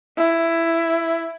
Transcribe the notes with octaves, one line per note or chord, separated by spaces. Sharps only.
E4